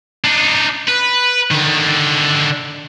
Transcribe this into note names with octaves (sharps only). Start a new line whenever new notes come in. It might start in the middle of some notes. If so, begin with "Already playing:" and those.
D4 D#4
B4
D3 D#3